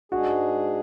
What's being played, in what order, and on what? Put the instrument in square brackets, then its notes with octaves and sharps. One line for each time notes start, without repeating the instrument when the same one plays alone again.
[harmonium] G#2 G#3 D4 G#4 [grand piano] F#4